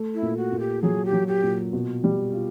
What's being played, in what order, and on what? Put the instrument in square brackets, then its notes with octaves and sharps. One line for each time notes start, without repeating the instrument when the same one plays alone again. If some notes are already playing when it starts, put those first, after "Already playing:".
Already playing: [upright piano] A3
[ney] E4
[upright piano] A#2
[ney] F#4
[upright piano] A#2
[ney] G4
[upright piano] F#3 [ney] G#4
[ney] G4
[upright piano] F#3
[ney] G4
[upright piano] A#2
B2
G3
F4